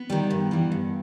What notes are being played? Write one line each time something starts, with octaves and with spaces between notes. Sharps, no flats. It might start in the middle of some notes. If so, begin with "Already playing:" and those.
Already playing: B3
D#3 G3
G2
E3 G3
G2